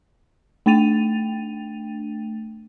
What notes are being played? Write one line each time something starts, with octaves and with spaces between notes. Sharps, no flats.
A3 D4 G5 A6 D#7 F7